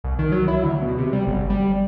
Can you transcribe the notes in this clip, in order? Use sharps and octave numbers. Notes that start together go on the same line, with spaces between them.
C2
D#3
F#3
E4
D2
B2
C3
G3
G1
G3